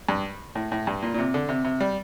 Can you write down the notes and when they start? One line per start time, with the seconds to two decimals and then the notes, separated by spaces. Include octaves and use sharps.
0.09 G2
0.55 A2
0.72 A2
0.87 G2
1.02 A#2
1.14 A#2
1.18 C3
1.34 D3
1.49 C3
1.64 C3
1.81 G3